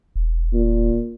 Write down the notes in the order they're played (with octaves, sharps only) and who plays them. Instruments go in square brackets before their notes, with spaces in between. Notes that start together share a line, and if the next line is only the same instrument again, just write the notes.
[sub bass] E1
[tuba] A#2